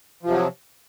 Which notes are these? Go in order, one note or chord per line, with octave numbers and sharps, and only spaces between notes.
C3 F3 F#3